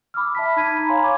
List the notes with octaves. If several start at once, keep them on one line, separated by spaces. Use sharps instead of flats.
B5 D6 E6 F6
E5 A5 B6
D#4 B5 G#6 B6 D#7
A#5 B5
C#5 F5 G#5 A#5 C6
B5 C#6 D6 G#6